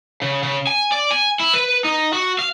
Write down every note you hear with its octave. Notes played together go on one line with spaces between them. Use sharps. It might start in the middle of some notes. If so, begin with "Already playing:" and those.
C#3
C#3
G#5
D5
G#5
E4
B4
D#4
F#4
F5